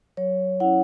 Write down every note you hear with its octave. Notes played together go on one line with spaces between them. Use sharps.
F#3 C#5
C#4 E4 F#5